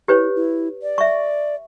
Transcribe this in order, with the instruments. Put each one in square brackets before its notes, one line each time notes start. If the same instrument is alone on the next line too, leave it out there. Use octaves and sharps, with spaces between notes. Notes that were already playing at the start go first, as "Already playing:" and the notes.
[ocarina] E4 [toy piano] G4 B4 C#5
[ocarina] E4
D5
[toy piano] E5 C#6